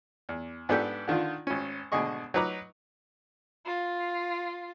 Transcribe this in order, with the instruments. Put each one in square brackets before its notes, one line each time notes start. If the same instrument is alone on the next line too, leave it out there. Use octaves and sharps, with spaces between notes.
[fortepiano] E2
G#2 B3 D4 G4 A4 G5
D3 D#3 D4 F4
G#1 C#4
G#1 B2 D3 G#4 D#5 C#6
F#3 D#4 B4 A#5 D6 F#6
[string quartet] F4